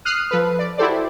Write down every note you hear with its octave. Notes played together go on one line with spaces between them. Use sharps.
D#6 F6 F#6 C7 D#7
F3 A4 B4
D5
E4 F#4 G4 A4 C5 D5